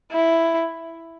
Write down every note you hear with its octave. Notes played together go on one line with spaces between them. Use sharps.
E4